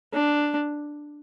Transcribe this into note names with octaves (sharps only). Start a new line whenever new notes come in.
D4